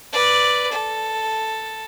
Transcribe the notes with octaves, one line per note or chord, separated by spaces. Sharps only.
B4 D5
A4